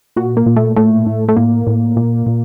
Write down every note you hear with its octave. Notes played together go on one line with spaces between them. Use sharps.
A#2 F#4
A#3
A#2
A3
A2 A3
A2
A3
A2 A#3
A2
A#2
A#2